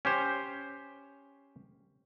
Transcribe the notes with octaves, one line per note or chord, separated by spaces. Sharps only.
C#4 G4 C5